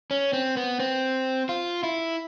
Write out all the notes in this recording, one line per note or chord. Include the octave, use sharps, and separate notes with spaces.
C#4
C4
B3
C4
F4
E4